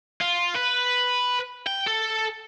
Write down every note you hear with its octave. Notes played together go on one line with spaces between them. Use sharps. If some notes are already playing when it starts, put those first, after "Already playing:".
F4
B4
G5
A4